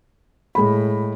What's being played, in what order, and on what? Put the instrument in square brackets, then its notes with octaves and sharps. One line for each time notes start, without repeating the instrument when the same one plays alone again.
[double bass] A2 [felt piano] G#3 B5